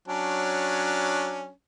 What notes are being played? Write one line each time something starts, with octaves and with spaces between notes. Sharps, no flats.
F#3 C#4 D4